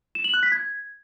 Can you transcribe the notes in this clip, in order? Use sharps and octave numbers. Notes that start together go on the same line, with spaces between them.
E7
F#7
F#6
B6
G#6